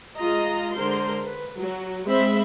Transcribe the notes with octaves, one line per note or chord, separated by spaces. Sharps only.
G#3 F4 D#5 A#5
D3 G#3 A#4 C5 C6
B4
F#3 F#4
G#3 C4 C5 E5 B5